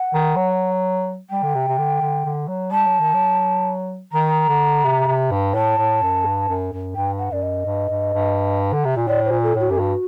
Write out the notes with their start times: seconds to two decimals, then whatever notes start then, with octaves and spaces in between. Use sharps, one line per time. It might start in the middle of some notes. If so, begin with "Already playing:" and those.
Already playing: F#5
0.14 D#3
0.36 F#3
1.30 G3 G5
1.43 D3
1.55 C3
1.68 C3
1.78 D3
2.01 D3
2.25 D3
2.48 F#3
2.71 G3 A5
2.86 F#3
3.00 D#3
3.14 F#3
4.13 D#3 A#5
4.49 D3
4.84 C3
5.07 C3
5.31 G2
5.54 A2 A5
5.77 A2
6.02 F#2
6.25 G2
6.48 F#2
6.73 F#2
6.95 G2 G5
7.19 F#5
7.32 F#2 D5
7.42 D#5
7.66 G2
7.89 G2
8.14 G2
8.73 D3
8.85 C3
8.96 A#2
9.07 A2 D5
9.25 C5
9.31 A#2
9.43 A4
9.55 A2 F#4
9.70 F#2 G4
9.78 G2 F#4